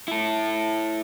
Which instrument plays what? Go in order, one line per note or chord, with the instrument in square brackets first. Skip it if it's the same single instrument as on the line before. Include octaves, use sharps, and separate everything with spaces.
[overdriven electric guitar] E4 A4